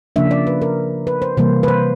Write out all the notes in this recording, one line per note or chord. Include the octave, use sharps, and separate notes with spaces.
C#3 F3 A#3 D4 E5
D5
B4
A#4
B4
C5
C3 E3 G3 A#3 C5
B4
C5